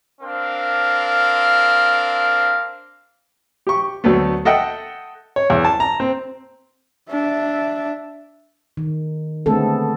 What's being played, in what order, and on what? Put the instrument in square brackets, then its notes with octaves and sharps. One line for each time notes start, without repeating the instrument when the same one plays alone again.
[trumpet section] C4 D4 A#4 F5
[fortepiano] G4 C#6
D2 F#3 A3 B3
A4 D#5 E5 F#5 G5
C#5
E2
A5
A#5
C4
[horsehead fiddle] D4 E5
[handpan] D#3
D3 G#3 A3 B3 C4 A4